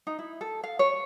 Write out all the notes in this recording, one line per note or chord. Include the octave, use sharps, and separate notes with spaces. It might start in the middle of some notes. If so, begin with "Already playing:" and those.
D#4
E4
A4
F5
C#5